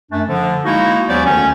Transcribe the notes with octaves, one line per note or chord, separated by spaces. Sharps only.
F#2 A3 D4
D3 F3
G#3 A#3 D#4 E4 F#4
D#2 F#3 B3 C#4 C5 D5
D2 D3 D#3 C#4